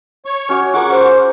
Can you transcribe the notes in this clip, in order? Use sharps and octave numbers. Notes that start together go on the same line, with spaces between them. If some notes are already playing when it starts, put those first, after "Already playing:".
C#5 C#6
C#4 F#4 D6
F4 G#4 A#4 F#5 C#6 D6
C5